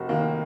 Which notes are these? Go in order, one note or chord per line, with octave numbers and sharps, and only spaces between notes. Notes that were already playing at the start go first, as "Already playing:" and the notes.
Already playing: F1 F#4 A#4
D#2 D#3 A#3